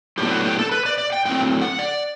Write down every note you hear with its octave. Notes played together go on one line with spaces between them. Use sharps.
A2 F#3 B3 D4 G4
F#4
G4
A4
B4
D5
D5
G5
A2 F#3 C4 G5
F#5
D5